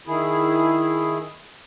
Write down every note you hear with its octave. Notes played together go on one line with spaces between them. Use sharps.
D#3 E4 G#4